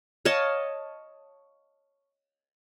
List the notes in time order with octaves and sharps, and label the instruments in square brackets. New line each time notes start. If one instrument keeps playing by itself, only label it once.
[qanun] C#5 D#5 F5 A5